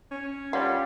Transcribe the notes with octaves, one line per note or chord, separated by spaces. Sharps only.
C#4
G3 F4 C#5 F#5